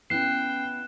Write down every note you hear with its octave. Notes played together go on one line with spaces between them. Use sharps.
B3 C#4 E4 G5 F#6 C7 E7